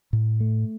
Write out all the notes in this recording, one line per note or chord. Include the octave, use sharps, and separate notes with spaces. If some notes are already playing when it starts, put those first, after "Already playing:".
A2
A3